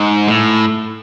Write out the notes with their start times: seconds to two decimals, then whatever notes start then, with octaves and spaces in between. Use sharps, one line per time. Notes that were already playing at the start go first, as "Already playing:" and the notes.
Already playing: G#2
0.28 A2